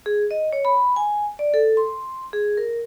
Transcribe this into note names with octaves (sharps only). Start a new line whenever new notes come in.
G#4
D#5
C#5
B5
G#5
D5
A4
C6
G#4
A#4